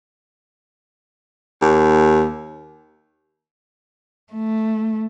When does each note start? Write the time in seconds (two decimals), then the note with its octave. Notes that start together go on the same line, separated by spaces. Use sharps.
1.61 D#2
4.33 A3